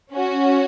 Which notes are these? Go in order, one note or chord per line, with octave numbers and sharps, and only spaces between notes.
C#4 F#4